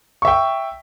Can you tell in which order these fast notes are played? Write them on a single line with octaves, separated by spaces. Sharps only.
C#6 E5 G5